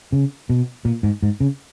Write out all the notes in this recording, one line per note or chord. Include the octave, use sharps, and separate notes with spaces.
C#3
B2
A#2
G#2
G#2
C#3